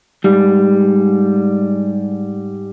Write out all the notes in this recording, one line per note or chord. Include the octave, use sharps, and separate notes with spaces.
G#2 G3